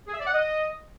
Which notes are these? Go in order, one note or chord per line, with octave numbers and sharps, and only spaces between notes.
G#4
E5
D5
F#5
D#5